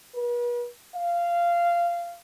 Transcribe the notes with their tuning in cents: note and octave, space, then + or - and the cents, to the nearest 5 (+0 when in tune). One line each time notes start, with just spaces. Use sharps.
B4 -40
F5 -15